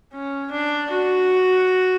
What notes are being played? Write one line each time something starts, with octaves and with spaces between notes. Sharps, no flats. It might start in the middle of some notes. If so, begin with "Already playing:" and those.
C#4
D4
F#4